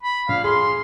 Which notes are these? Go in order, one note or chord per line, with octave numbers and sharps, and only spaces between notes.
B5
A#1 F5
G#4 C6